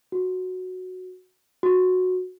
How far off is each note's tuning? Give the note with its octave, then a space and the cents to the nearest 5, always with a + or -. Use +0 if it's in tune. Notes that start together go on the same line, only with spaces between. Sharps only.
F#4 -5
F#4 -10